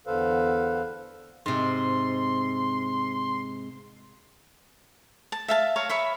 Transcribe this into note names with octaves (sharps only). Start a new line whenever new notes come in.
E2 D3 A4 B4 C5 F5
G#2 C3 C6
A5
E5 F5 A5
C#5 F5 A#5
C#5 E5 B5